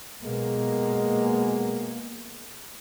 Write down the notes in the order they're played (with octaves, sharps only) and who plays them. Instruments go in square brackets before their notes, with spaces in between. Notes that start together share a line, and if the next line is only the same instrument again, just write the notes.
[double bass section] B2 A#3 [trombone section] F#3 G#3 B3